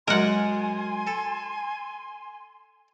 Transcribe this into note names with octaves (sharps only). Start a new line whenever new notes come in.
F#2 G#3 A#4 F#5 G#5 C6
A4